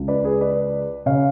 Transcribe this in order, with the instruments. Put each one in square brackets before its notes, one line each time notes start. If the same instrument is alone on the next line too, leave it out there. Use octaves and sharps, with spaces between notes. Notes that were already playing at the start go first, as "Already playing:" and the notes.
Already playing: [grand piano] C#2 C#3
B4 D5
G#4 B4
B4 D5
C#3 C#5 F5